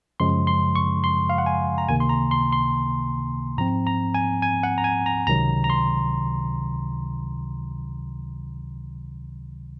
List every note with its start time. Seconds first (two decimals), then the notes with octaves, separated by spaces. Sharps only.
0.20 F#2 C#3 F3 G#3 C6
0.47 C6
0.76 C#6
1.04 C6
1.29 F5
1.38 F#5
1.46 G#5
1.78 A#5
1.88 C#2 C3 D#3 A#3 G#5
2.00 C6
2.09 A#5
2.31 C6
2.52 C6
3.57 G#2 F3 C4 A#5
3.87 A#5
4.15 G#5
4.42 G#5
4.63 F#5
4.78 A#5
4.84 G#5
5.06 A#5
5.27 C#2 C3 D#3 F#3 A#5
5.64 A#5
5.70 C6